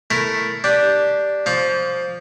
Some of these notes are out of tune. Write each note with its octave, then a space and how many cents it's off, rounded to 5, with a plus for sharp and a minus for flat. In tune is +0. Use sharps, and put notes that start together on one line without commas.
A3 +0 E4 +0 A#4 +0
D4 +0 G4 +0
F3 +5 F5 +15 D6 -45